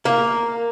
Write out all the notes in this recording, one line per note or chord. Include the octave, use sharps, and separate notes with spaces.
A#3